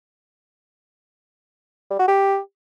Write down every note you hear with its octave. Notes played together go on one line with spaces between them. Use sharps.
G3
F#4
G4